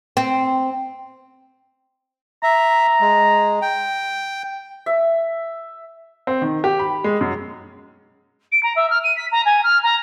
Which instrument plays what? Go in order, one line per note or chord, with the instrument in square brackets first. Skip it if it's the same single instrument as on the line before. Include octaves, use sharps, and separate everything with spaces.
[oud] C4
[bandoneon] E5 [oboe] A#5
[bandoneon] G#3
G5
[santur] E5
[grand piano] C4
D#3
G4
B5
G#3
F#2
[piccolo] D7
A#5
E5
F6
D#7
B6
A#5
G#5
F6
A#5